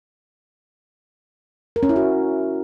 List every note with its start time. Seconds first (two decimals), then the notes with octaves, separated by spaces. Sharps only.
1.76 A#4
1.83 C#4
1.89 E4
1.96 F#4